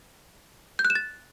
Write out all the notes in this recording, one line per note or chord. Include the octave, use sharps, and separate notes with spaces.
G6
F#6
E7
A6